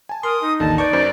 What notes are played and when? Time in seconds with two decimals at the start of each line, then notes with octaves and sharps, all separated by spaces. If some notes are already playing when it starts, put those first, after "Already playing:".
0.09 G#5 A5
0.23 A#4 C6 D#6
0.41 D#4
0.60 A1 D#2 D3 A5
0.78 B4 D5 A5 C#6 D6 G6
0.93 F#2 C5